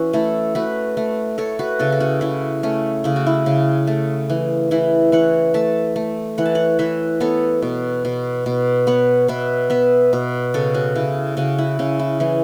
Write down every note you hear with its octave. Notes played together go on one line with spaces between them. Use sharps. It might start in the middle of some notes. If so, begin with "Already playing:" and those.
Already playing: E3 C#4 F#4 E5
A3 E4 A4
A3 F#4 B4
A3
A3 A4 C#5
F#4 B4
C#3 E4 A4
A4
C#4 F#4
C#3 E4
A3 C#4
C#3 E4
F#4
E4
C#3
A3
E3
E3 E4
E3 C#5 F#5
A3 E5 A5
A3
E3 F#5
A5
C#5 F#5
E3 B4 E5
B3 A4 C#5
B2
B2
B2
B3 C#5 F#5
B2 B4 E5
B3 B4 E5
B2
C#3 A4 C#5
C#4 F#4
C#3 E4
C#3 C#4 F#4
E4
C#3 C#4
E4
E3 C#4